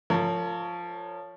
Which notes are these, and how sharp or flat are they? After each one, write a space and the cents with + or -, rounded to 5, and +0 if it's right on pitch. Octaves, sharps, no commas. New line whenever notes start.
F3 +0 A#4 -40 C#5 +15